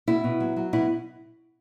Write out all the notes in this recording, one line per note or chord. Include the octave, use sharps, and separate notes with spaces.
B2 E4
B2
F#3
F#3
B2 E4